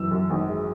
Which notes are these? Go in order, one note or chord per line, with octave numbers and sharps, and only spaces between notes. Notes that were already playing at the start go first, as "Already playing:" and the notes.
Already playing: F#2 E3 E6
F#2
G#1
G#3